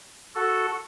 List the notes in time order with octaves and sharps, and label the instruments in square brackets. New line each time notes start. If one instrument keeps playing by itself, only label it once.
[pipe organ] F#4 A4